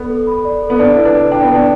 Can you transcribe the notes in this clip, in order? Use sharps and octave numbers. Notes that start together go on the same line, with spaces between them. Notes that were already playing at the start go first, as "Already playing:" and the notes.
Already playing: B3 A4 D5
A4
B5
D5
A4
B3
D4 D5
E4 B4
D4
B4
D4 G5
B3
D5
D4